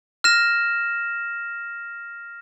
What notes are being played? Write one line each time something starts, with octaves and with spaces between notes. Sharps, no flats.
F6 A#6 E7